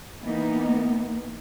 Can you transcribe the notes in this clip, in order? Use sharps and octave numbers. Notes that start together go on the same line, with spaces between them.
E3 A#3 B3 D#4